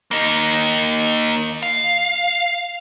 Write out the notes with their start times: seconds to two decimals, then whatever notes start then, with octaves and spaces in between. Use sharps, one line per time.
0.11 A#3 D#4
1.63 F5